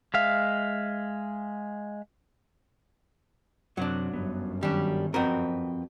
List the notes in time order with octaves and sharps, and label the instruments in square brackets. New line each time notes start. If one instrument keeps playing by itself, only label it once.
[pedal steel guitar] G#3 E5 F5
[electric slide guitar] F#2 C3 F#5 [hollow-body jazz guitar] F#3 D4
[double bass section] G1 F#2 [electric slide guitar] B3
[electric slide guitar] D#3 C#4 [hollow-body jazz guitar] G3 D4
[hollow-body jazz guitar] F2 F#4 A#4 [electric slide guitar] C4 B4 G5